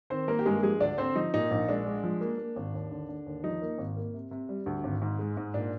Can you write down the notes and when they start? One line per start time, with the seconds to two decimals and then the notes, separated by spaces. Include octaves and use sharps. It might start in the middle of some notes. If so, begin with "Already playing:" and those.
0.10 D#3 C4 C5
0.28 A#3 A#4
0.39 G4
0.46 G2 G#3 G#4
0.63 F3 G#3 G#4
0.80 D2 D4 D5
0.98 D3 C4 C5
1.16 F3 D#4
1.34 A#2 D#4
1.51 A#1
1.69 G#3 D4
1.86 G#3
2.04 F3
2.21 A#3
2.38 A#3
2.56 G#1
2.74 D#2
2.91 D3
3.09 D3
3.26 D#2
3.44 F3 D#4
3.62 A#3
3.78 G#1
3.97 A#3
4.14 C3
4.31 C3
4.49 G3
4.66 D2
4.84 G#1
5.02 G#2
5.19 G#3
5.37 G#2
5.54 A#2 D4